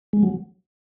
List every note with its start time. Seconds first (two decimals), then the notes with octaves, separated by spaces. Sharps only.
0.13 G#3
0.23 F#3